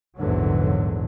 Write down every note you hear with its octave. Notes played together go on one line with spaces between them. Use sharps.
A#1 E2 G#2 D3 F#3